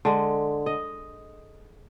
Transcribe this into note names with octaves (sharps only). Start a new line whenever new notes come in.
D3 G#3
D#5